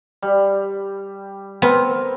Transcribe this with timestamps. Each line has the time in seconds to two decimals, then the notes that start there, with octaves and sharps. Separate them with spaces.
0.22 G3
1.62 B3 C4 A#4